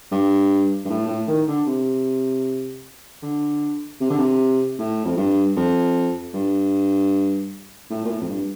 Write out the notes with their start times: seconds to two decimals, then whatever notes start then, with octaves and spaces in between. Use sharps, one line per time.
0.12 G2
0.85 G2
0.90 A2
1.08 A2
1.28 D#3
1.48 D3
1.67 C3
3.23 D3
4.00 C3
4.10 D3
4.19 C3
4.79 A2
5.05 F2
5.17 G2
5.56 F2
6.34 G2
7.90 A2
8.05 A#2
8.10 A2
8.21 F2
8.29 G2